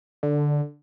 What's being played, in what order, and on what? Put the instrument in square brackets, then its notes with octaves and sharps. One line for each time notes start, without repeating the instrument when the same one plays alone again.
[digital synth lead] D3